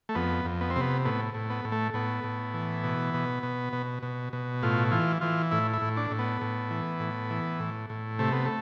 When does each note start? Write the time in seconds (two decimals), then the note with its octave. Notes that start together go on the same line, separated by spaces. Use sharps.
0.09 A3
0.15 F2 B3
0.45 F2
0.61 B3
0.70 C4
0.76 C3 B3
1.05 A2 B3
1.34 A2
1.50 B3
1.65 A2
1.72 A3
1.94 A2 B3
2.24 A2
2.54 E3
2.84 B2
3.14 B2
3.43 B2
3.73 B2
4.03 B2
4.33 B2
4.63 A2 F4
4.91 E3 F4
5.21 E3 F4
5.51 A2 E4
5.73 E4
5.82 A2
5.97 D4
6.11 A2
6.19 B3
6.41 A2
6.71 E3
7.00 A2
7.30 E3
7.60 A2
7.90 A2
8.19 C3 A3
8.32 B3
8.45 A3